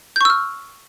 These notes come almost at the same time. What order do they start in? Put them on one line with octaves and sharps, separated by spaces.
G6 C#6 E6 F6